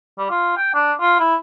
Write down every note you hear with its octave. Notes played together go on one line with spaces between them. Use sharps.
G3
F4
G5
D4
F4
E4